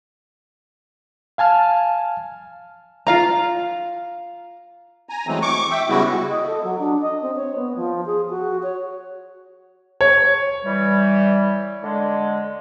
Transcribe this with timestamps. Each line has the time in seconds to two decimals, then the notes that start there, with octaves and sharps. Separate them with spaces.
1.38 F5 G#5 A5 F6
3.07 F4 F5 A#5
5.09 G#5 A#5
5.27 E3 F#3 G#3 A3 C4
5.42 C#6 D6
5.71 E5 G5
5.89 C#3 G3 G#3 B3 E4 F#4
6.27 D#5
6.46 A4
6.63 F#3
6.79 D4
7.01 D#5
7.22 C4
7.36 C#5
7.56 B3
7.76 F3
8.06 G#4
8.29 F#4
8.63 C#5
10.01 C#5
10.64 E3 G3
11.82 D3 G#3